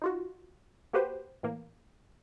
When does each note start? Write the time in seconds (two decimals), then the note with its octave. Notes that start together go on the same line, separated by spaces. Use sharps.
0.02 D#4 F4 F#4
0.93 A#3 F#4 G4 B4 C5
1.43 A2 E3 A#3